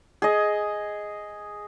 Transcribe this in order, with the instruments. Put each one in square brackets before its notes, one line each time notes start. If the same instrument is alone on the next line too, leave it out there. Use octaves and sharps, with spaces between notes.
[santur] G#4 D#5